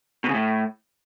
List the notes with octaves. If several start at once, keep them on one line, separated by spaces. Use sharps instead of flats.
B2
C#3
A2